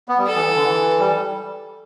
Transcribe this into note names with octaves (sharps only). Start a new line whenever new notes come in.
B3
G3
A4
E3
E3
D3
E3
G3